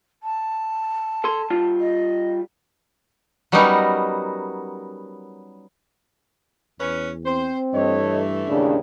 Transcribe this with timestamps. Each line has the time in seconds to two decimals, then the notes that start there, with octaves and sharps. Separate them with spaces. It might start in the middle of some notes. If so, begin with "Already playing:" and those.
0.23 A5
1.24 A4 C6
1.50 G3 F4
1.80 D#5
3.52 F#3 G3 B3 C#4 D#4 A#4
6.80 E2 C#4 B4
7.26 C4 C5
7.74 G2 E3 A3 A4 C#5 D#5
8.49 D#2 A2 C#3 D4